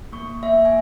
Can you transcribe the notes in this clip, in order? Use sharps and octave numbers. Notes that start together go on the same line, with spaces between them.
A#3 C#6
A#3 E5
G#5